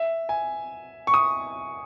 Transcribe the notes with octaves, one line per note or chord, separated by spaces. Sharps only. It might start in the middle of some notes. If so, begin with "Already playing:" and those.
Already playing: E5
G#5
C#6
D#6